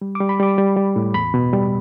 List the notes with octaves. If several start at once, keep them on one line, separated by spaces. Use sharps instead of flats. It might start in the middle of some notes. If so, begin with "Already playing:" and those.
G3
D6
G3
B5
G3 D6
G3
G3
A2
E2 B5
B2
G3